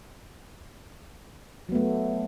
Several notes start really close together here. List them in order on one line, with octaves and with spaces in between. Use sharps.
F#3 B3 A3